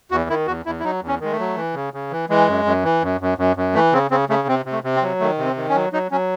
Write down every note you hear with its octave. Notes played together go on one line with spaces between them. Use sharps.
E2 F#4
D#3 E4
E2 F#4
E2 E4
E4
F#3 D#4
E2
C#4
D#3 G#3
A3
F#3
E3
C#3
C#3
E3
E3 G#3
F#2
F#2
E3
F#2
F#2
F#2
F#2
E3 A3
C#3 C4
C#3 C4
C#3 A3
C3 C4
C3
A3
C3
C4
F#3
D#3 A3
C3
C4
D#3
C#4
F#3
F#3 D#4
F#3 C#4